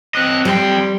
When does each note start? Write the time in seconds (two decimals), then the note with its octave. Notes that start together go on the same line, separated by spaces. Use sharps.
0.15 C4 D#5 F#6
0.45 F2 G3 G5 C6